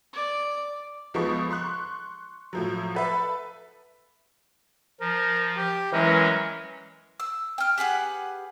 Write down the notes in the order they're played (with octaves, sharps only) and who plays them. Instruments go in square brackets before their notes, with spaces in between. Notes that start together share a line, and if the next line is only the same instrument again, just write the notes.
[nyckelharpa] D5
[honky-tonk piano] C#2 F3 G#3 B3 A4 C#6
C6 C#6 F#6
A2 F3 F#3
A4 B4 E5
[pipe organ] F3 [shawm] A#4
[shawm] G4
[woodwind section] E3 [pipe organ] F#3 G#3 C#4 [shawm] A#4
[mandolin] E6
G5 F6
G4 G#4 B4 F#5